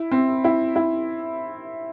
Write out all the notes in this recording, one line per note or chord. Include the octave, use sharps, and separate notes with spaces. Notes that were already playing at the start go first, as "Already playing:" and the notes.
Already playing: E4
C4
E4
E4